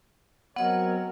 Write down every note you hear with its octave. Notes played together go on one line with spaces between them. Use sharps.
F#3 B3 C4 A#4 C#5 D#5 F#5